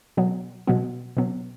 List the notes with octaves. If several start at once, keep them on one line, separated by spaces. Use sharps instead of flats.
B2 F#3 B3
B2 F#3 B3
B2 F#3 B3